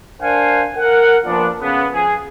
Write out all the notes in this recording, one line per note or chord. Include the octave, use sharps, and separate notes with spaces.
D4 A#4 C5 F5 F#5 G#5
A#4 F#5
A#2 F3 B3 D4
C#3 B3
F3 G#4